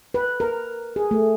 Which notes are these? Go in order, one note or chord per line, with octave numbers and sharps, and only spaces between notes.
B4
A#4
G#4
A3